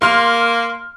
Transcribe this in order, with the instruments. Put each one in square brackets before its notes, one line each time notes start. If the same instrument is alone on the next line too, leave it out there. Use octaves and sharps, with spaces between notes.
[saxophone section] A#3 [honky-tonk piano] C6 F6